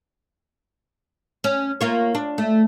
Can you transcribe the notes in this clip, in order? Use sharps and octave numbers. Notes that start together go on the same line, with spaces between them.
C#4
A#3 F4 C#5
D4
A3